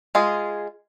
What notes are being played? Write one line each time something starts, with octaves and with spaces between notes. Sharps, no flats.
G#3 F4 G#4